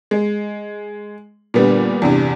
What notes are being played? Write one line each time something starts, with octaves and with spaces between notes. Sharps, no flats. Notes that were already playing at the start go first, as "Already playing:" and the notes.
G#3
A#2 D3 G3 B3
E2 G2 C3